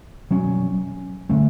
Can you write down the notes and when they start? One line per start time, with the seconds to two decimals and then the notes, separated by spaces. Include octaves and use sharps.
0.31 B2 F#3 C#4
1.29 D3 A3 C#4